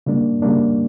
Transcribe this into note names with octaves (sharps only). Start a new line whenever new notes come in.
C#3 G3 A#3 D4
C#3 G3 A#3 D4